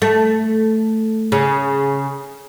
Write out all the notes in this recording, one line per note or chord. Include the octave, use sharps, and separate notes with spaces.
A3
C#3